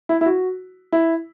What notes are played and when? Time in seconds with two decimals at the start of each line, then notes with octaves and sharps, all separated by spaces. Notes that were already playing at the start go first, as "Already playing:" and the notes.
0.09 E4
0.21 E4
0.26 F#4
0.92 E4